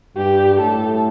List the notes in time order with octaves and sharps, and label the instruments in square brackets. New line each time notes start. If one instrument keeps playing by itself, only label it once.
[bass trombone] G2 [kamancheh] G4
[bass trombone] A2 [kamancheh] A4